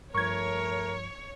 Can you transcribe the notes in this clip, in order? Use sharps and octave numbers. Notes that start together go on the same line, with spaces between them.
G2 F3 A3 A#4 C#5 C#6 G#6